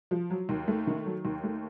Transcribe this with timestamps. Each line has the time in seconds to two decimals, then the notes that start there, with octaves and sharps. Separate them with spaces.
0.11 F3
0.30 F#3
0.49 D#2
0.68 A3
0.87 D#3
1.06 F#3
1.25 D#2
1.44 A3